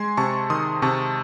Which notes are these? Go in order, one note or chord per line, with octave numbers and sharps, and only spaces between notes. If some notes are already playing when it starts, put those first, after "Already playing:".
Already playing: G#3 G#5 C6
C3 A5 C#6
D#3 C6 D#6
C3 A5 C#6